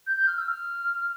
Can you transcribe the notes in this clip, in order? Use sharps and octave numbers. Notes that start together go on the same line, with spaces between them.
G6
G6
F6
E6
F6